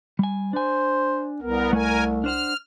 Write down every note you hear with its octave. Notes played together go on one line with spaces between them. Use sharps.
G3 G#5
D4 C5 G#5
C2 B3 A#4
A3 A#4 G#5
D4 C5 F#5 F6